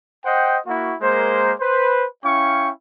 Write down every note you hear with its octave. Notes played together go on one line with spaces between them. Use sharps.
C5 D#5 F#5 G5
A#3 E4 F#4
G#3 A#3 A#4 C5
B4 C5
C#4 E4 F5 G5 C#6